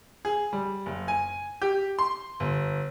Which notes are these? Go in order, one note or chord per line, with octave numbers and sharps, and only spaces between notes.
G#4
G3
F#1
G#5
G4
C6
G1